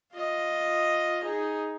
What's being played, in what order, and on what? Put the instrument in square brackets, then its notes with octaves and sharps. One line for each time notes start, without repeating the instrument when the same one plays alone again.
[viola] F4 D#5
D#4 G#4